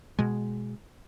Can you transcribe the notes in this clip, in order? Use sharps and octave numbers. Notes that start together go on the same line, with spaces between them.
B2 G#3